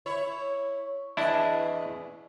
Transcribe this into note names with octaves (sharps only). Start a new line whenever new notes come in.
E4 C#5
E2 D4 E4 D#5